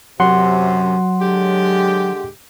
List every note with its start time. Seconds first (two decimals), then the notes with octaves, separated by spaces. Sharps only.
0.20 F#2 C3 F#3 F#5 C6
1.21 D3 G#3 G4